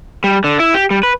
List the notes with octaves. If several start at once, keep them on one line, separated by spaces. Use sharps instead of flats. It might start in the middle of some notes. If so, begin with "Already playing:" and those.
G3
D3
E4
G4
G3
B4